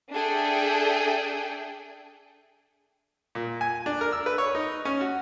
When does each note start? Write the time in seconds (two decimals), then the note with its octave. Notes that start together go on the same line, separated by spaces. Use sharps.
0.12 D4 G#4 A4 E5 G5
3.35 A#2
3.61 G#5
3.86 D4
4.01 A#4
4.12 E6
4.26 B4
4.38 C#5
4.55 D#4
4.85 C#4
5.01 F#4